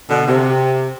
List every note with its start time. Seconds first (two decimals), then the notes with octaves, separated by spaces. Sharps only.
0.10 B2 D3
0.27 C3